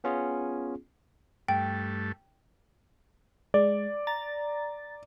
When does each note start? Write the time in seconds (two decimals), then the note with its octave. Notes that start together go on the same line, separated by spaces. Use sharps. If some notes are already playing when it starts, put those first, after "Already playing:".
0.04 B3 C#4 F4 G#4
1.48 G2 A3 G5
3.54 G#3 D5
4.07 A#5 A6